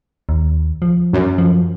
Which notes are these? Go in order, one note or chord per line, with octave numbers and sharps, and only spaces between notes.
D#2
F3
F#2
F3